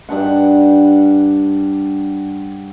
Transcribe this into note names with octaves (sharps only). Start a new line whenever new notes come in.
G2 D4 F#5